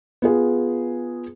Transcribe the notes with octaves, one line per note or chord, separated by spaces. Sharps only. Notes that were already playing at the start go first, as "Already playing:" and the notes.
B3 F4 G#4